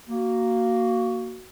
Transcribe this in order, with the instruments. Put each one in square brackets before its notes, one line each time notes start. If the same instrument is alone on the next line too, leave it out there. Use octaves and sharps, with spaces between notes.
[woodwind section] A#3 F#4